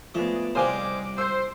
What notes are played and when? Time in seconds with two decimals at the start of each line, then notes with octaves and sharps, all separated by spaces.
0.15 F3 A3 B3 G#4 D5 D#5
0.55 C2 G3 G#3 C5 F5 G#5 D6
1.18 C5 E6